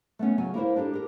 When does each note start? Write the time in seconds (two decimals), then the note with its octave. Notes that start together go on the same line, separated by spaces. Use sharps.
0.19 A3 B3 C#4
0.38 C#3 F#3 G#5
0.54 A#3 E4 A#4 C5
0.76 D4 D#4 G4 A4
0.94 G4 A#4